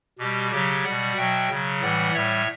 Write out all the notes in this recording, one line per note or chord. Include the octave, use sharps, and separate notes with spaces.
B2 G3 G4
C#3 F#3 G4
B2 G3 D5 F#5
B2 F#3 E5 G5
C#3 F#3
A2 E3 G3 D5 F#5
A2 G3 C#5 E5